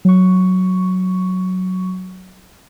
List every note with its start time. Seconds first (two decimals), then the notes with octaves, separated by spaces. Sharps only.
0.05 F#3 C#6